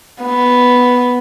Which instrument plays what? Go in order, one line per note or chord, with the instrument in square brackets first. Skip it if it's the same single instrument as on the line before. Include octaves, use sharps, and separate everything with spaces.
[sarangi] B3